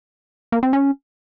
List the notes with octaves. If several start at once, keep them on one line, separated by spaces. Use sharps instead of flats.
A#3
C4
C#4